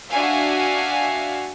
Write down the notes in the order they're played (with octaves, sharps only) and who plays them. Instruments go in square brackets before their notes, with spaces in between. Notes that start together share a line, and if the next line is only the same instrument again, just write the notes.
[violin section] D4 F#4 E5 F5 G#5